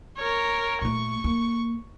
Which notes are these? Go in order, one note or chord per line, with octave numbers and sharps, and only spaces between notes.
A#4 C#5
A#2 A3 C#6
A#3